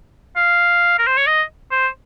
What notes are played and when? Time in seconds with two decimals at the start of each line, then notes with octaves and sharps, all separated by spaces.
0.36 F5
0.99 A#4
1.07 C5
1.17 C#5
1.27 D#5
1.72 C5